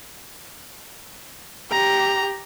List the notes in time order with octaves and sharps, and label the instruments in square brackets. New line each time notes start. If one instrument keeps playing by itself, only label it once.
[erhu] G4 [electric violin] A#5